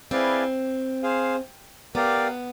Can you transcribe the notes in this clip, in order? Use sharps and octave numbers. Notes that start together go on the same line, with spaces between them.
C4 E4 G#4 B4 D5 F5
G#4 C5 F5
B3 G4 A#4 D5 F5